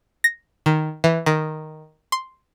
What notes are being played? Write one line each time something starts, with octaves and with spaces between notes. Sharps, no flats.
A#6
D#3
E3
D#3
C6